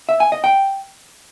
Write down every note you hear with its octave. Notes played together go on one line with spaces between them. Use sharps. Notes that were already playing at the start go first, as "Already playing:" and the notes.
E5
G#5
D#5
G5